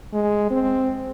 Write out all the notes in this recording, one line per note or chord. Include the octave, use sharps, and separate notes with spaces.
G#3
C4